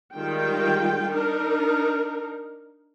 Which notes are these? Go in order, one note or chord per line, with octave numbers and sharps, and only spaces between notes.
D#3 G3 G#3 F4 G5
D4 D#4 A#4